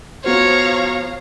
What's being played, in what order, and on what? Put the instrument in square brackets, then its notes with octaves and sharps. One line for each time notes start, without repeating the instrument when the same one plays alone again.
[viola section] F3 F5 [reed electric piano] B3 F#4 C5 [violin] C#5 A#5